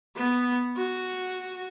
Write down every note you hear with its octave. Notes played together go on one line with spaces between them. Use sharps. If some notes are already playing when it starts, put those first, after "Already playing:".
B3
F#4